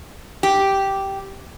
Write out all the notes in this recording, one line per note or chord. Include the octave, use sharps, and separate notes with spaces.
G4